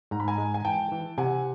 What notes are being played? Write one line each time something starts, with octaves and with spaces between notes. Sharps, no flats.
G#2 A#5
B5
G#5 A#5
G#3
G#5
E3 G5 A5
E3
C3 F#5 G#5